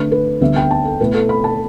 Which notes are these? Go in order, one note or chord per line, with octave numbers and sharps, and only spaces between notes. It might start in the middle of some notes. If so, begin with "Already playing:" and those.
Already playing: D3 A3 D4 B4
B4
D2 D3 G3 B3 E5
G5
A5
A4
B2 A3 E4 B4
A4
B5
A5